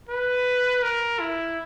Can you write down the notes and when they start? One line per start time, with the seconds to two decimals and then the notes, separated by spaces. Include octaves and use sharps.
0.09 B4
0.83 A#4
1.20 E4